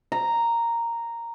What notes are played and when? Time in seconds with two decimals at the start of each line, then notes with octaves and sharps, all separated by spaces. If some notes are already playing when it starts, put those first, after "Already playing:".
0.12 A#5